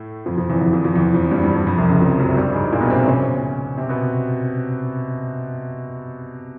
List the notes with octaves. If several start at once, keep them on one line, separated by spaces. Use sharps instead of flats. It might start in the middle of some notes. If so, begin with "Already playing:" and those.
Already playing: A2 A3
F2 F3
F2 F3
E2 E3
E2 E3
F2 F3
F2 F3
E2 E3
F2 F3
G2 G3
G2 G3
G2 G3
F2 F3
C2 C3
C#2 C#3
F2 F3
F#2 F#3
G2 G3
G#2 G#3
A#2 A#3
B2 B3
C3 C4
C#3 C#4
C3 C4
B2 B3